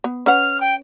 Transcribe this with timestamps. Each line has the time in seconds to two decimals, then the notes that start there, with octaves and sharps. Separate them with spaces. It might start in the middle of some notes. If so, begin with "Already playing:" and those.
0.04 B3
0.26 C#4 B4 F#5 F6
0.60 G5